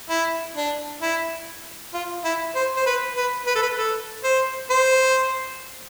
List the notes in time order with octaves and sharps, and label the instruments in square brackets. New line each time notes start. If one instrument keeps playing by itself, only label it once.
[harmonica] E4
D4
E4
F4
E4
C5
C5
B4
B4
B4
A4
B4
A4
C5
C5